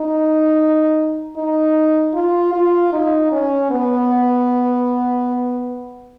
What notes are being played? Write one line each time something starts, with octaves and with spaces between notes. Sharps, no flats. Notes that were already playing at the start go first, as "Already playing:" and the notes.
Already playing: D#4
D#4
F4
F4
D#4
C#4
B3